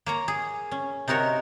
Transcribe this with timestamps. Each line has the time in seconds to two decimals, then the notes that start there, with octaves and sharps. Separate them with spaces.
0.06 A#3 C#5 A#5
0.28 G#4
0.71 C#4
1.08 C3 D#4 F#4 A#4 C#5